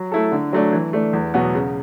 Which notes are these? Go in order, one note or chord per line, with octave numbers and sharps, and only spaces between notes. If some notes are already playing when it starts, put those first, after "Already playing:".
Already playing: F#3
A3 E4 A4
D3
F#3 A3 D4
E3
A3 D4
E2
B2 F#3 B3
C#3